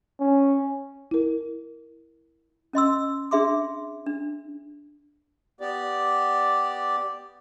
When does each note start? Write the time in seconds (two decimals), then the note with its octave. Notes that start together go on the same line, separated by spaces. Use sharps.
0.20 C#4
1.11 E4 A#4
2.73 C#4 D#5 C6 E6
3.31 D4 G#4 E5 C6 D6
4.06 D4
5.61 B3 G4 D5